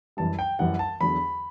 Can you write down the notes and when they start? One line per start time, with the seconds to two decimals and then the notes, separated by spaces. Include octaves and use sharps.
0.17 F#2 E3 G3 A5
0.39 G5
0.59 F#2 E3 G3 F#5
0.79 A5
1.01 E2 D3 F#3 B5